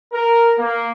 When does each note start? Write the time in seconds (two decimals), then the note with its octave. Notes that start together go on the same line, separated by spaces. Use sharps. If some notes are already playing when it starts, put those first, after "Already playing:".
0.13 A#4
0.58 A#3